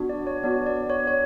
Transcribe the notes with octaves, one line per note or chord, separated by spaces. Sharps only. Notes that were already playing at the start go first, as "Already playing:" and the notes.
Already playing: B3 D4 F#4
D5
C#5
B3 D4 F#4 D5
D5
C#5
C#5